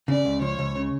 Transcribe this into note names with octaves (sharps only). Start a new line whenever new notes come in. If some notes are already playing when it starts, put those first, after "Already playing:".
C#3 D5
C#2
F3 C#5
C#2
C#3